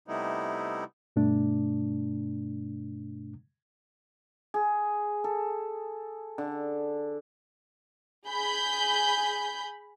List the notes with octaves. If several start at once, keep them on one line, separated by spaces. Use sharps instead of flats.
C3 G3 A3 B3 D#4 E4
G2 B2 A3 D4
G#4
A4
D3
G#4 B5 G6